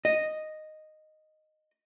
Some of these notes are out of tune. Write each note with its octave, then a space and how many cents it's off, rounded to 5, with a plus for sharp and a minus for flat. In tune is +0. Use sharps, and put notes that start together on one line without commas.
D#5 -5